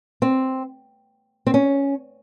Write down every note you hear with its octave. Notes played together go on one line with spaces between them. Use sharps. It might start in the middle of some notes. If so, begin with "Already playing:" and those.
C4
C4
C#4